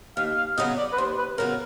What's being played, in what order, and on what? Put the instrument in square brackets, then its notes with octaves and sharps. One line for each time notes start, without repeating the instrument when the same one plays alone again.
[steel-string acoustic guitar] D#2 [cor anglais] F5
[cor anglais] F5
[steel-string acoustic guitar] C#3 F#3 B3 [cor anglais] D#5
[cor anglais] D5
B4
[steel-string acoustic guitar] D#2 [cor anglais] C5
[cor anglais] B4
[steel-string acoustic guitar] C#3 F#3 B3 [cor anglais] A#4